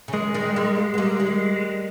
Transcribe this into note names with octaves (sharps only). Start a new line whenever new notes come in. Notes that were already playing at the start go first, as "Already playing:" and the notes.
C#3
D#3 G#3
D#3 G3
G3 A#3
B3
G3 A#3
D#3 G3